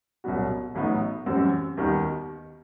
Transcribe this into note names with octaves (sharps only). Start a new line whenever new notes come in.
C2 B2 F#3 B3 F#4
A1 A2 F#3 B3 D#4
F#2 E3 G3 C4 F#4
D#2 D#3 G3 B3 F#4